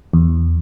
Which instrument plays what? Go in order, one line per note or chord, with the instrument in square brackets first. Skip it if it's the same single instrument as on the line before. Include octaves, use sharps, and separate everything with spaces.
[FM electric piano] E2